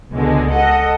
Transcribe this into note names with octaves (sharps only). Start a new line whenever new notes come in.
C#2 B2 D3 G#3
A4 D#5 F#5